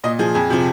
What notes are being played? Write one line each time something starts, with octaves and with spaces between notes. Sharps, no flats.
A#2 D#5
F3 G#4
F2 G#4
C3 F3